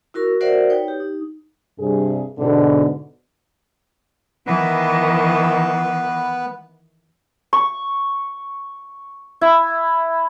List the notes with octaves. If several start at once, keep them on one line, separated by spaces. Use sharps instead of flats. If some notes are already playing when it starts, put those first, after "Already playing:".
E4 F#4 A#4 C#6
F#4 A#4 C5 D5 E5 F#5
D#4 B4 C#5 G5
G4
D#4
G2 C3 G#4
G#2 B2 D3
D#3 E3 B3 B4
C#6
E4